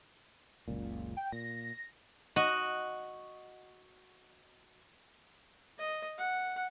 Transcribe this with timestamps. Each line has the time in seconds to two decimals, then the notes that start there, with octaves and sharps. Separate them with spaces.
0.68 F#1 C#2 A#2
1.17 G5
1.32 A#2 A#6
2.36 F#4 D#5
5.78 D#5
6.18 F#5